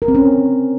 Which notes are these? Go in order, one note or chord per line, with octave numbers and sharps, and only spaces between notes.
A#4
C4
C#4